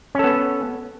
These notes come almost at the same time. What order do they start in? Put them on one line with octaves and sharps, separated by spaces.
C#4 A4 B3